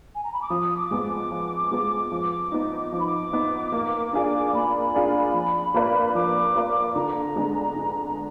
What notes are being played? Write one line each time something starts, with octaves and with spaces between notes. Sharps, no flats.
G#5
A#5
B5
D6
F3 D#6
D6
G#3 B3
D6
F3
G#3 B3
F3
B3 D#4
F3 D6
B5
D6
B3 D#4
A#3
D4 F4 G#4 D5
A#3 B5
D4 F4 G#4 D5
F3
A#3 F4 B4 D5
F3 D6
A#3 F4 B4 D5
D3 A#5
G#3 B3 D4
D3